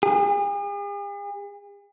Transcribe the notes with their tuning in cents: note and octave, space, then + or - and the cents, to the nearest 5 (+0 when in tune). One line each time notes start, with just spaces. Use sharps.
G#4 -45